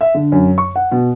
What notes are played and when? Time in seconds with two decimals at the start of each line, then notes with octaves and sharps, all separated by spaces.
0.01 E5
0.15 D3
0.32 F#2
0.58 C#6
0.76 F#5
0.92 B2